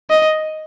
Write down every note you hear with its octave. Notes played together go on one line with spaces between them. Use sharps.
D#5